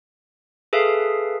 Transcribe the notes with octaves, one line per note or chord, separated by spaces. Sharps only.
G#4 A4 B4 E5 F5